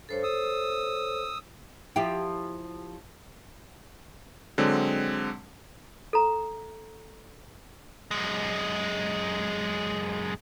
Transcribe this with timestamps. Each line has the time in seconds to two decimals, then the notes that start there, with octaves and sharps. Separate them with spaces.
0.09 G2 A4 C5 C#5
0.23 D#6 E6
1.96 F3 E4 G4
4.58 D3 F#3 G#3 C4
6.13 A4 A#5
8.11 F#2 G#3